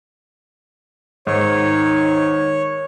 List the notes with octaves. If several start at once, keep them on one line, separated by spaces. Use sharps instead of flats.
G#2 D#3 C#5